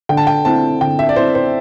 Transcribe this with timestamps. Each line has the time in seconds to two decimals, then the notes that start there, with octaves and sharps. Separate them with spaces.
0.09 D3 G5
0.17 A5
0.27 G5
0.45 C4 E4 A5
0.81 D3 G5
0.99 E5
1.09 D5
1.16 C4 E4 C5
1.35 C5